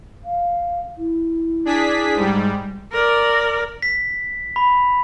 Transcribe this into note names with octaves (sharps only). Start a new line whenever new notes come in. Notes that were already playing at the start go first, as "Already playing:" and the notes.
F5
E4
D4 G#4 B6
G#2 G3
A#4 D5
B6
B5